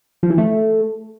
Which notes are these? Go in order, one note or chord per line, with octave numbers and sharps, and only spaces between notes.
F3
E3
A3